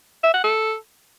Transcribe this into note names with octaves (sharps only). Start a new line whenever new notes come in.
E5
F#5
A4